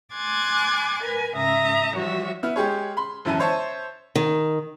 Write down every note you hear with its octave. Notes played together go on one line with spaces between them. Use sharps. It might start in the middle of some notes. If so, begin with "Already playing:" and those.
G#5 C6 D6 F#6 G#6 A6
A#4 B4 G#5
G#2 C#3 E5 A#5 D#6
E3 F3 G3 F#4 C#5 E5
B3 E4 F6
G#3 G4 G#4 C#5
B5 C6
E1 F#2 E3 E4 A5 D#7
C5 C#5 E5 A5
D#3